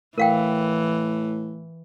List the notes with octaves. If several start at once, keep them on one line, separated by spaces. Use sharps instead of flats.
A2 E3 A#4 F5 G5